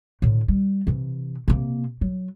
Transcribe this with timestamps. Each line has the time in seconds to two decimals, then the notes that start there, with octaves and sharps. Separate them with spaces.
0.22 A2 D3
0.48 G3
0.87 C3 E3
1.48 C3 A#3
2.01 F#3